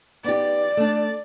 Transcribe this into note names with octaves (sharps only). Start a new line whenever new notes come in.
B3 D#4 G4 D5
A3 D4